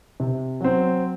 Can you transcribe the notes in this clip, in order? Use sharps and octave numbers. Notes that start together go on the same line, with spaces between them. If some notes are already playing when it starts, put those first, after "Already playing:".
C3
F#3 C4